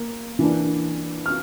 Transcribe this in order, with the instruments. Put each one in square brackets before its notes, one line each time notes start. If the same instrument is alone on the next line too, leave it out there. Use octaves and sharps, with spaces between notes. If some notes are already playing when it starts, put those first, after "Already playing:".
Already playing: [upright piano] A#3
E3 A#3 D4
F6